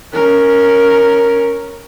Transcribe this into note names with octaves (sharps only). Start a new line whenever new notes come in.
C#4 A#4